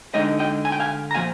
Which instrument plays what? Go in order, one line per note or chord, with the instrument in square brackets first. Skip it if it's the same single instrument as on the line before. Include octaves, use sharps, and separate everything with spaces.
[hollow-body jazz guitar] D3 G#3 D#4 D#5 G5
D#5 G5
G#5
G5
F5 G#5
A#5
A#2 F3 F5 G#5